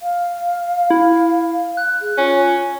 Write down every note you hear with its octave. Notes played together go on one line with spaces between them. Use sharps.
F5
E4
F#6
G#4
C#4 F4